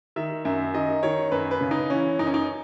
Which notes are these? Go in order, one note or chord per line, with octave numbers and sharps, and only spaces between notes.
D#3 E5
F#2 E5
D#3 D#5
D#3 C#5
F#2 B4
B4
C#3
D#4
E3 C#4
F#2 D#4
C#4
D#4